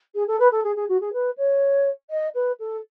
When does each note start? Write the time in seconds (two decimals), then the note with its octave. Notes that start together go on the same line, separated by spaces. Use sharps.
0.15 G#4
0.27 A4
0.39 B4
0.52 A4
0.64 G#4
0.76 G#4
0.88 F#4
1.01 G#4
1.13 B4
1.37 C#5
2.10 D#5
2.34 B4
2.59 A4